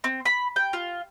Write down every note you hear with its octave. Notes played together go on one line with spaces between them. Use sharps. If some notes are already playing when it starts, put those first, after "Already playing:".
C4
B5
G5
F4